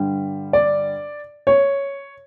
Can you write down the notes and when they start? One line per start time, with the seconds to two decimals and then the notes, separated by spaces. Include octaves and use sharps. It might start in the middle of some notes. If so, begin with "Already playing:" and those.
Already playing: G2 D3 G3
0.53 D5
1.47 C#5